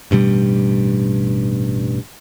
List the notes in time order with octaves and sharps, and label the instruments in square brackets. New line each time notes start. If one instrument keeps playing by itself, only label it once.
[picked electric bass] A1 G2 B2 G3